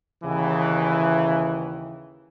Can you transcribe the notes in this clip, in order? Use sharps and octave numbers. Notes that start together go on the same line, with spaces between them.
D#2 C#3 E3